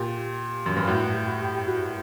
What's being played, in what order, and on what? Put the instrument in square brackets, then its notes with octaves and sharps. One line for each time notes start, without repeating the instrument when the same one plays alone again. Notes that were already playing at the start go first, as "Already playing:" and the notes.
Already playing: [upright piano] A#2 [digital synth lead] G4
[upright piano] F#2
G2
[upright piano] A2 [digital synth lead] F#4
[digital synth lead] F#4
G4
F#4
G4
G4
F#4